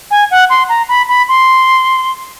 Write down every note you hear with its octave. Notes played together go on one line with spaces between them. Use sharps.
G#5
F#5
C6
A#5
B5
B5
C6